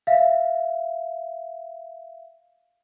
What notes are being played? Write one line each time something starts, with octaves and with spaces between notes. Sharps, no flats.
E5 F5